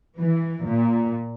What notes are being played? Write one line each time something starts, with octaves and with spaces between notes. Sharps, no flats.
E3
A#2